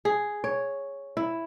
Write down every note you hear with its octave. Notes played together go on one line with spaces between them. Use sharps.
G#4
C#5
E4